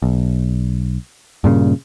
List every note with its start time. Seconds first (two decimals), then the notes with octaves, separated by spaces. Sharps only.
0.02 B1
1.44 G2 A#2 C#3